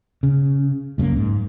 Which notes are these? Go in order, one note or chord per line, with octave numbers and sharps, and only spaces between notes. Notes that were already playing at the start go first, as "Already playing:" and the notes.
C#3
C#2 F#2 F3 A#3
G#2